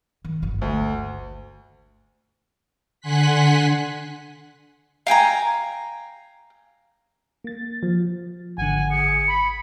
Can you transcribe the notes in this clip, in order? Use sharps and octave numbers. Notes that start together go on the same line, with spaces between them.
D#3
G1 F4
D2
D3 F#5 G#5 C6 F#6 B6
F5 G5 G#5 A#5
A#3 A6
F3
G#1 D3 F#5 G#5
G#4 C#7
B5